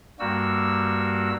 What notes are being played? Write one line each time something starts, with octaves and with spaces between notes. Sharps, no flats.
G2 G3 A#3 F#4 E6